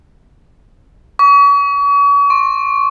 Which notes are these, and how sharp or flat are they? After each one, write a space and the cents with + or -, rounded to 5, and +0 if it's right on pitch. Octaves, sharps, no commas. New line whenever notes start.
C#6 +40
C#6 -45